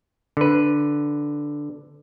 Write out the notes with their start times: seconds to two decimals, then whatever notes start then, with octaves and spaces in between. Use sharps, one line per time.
0.37 D3 B4